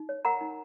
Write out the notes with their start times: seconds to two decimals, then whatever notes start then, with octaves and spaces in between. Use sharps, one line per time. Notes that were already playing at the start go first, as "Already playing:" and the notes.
Already playing: D#4
0.09 C#5
0.25 A#4 F#5 A#5
0.41 D#4